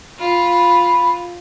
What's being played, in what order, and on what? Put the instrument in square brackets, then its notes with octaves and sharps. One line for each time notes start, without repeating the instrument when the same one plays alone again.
[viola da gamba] F4 [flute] B5